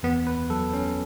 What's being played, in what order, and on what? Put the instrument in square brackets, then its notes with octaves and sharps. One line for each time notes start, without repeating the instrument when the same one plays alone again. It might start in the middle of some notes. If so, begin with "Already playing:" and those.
[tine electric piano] E2 B3
B4
F#3 A4
C#4